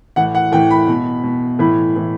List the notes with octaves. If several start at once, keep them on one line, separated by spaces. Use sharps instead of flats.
A2 E3 F#5
F#5
A2 E3 G5
B5
B2
B2
A2 E3 B5
A2 E3